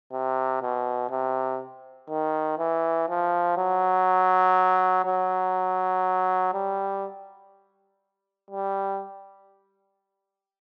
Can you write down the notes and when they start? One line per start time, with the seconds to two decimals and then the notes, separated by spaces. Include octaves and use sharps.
0.12 C3
0.62 B2
1.10 C3
2.09 D#3
2.58 E3
3.09 F3
3.58 F#3
5.05 F#3
6.54 G3
8.51 G3